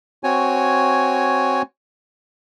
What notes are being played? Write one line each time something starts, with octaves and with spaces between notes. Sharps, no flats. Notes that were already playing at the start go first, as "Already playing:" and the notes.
C4 F#4 C#5 G#5